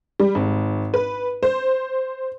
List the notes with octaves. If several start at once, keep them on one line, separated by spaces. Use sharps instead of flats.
G3
G#1
B4
C5